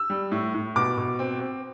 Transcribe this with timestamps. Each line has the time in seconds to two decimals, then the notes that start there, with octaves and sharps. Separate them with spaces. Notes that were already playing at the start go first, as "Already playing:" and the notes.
Already playing: E6
0.10 G3
0.32 A2
0.54 A2
0.76 B2 D6
0.97 B2
1.19 C4
1.40 C4